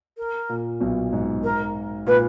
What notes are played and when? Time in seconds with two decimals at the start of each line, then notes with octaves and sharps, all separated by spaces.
0.17 A#4
0.49 A#2
0.80 B1 B2
1.13 G#2
1.43 A#4
2.07 A#2 B4